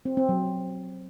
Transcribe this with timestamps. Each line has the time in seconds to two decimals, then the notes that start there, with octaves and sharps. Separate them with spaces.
0.05 C4
0.17 C4
0.29 F#3